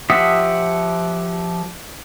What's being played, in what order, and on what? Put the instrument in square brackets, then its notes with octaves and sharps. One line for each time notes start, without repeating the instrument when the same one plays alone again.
[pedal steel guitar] F3 G4 E5 F#5 D#6